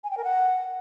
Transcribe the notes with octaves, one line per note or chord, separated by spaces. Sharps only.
G#5
G5
A#4
F#5